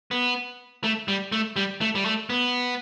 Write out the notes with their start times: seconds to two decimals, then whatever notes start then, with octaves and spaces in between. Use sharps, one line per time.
0.11 B3
0.84 A3
1.08 G3
1.32 A3
1.56 G3
1.81 A3
1.95 G3
2.05 A3
2.30 B3